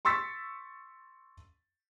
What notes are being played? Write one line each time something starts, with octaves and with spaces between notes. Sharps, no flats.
C6 C#6 E6 A6 B6